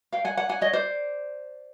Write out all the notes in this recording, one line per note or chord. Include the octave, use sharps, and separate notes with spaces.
F5 G5
F#5 G#5
F#5 G#5
F#5 G#5
C#5 D#5
C5 D5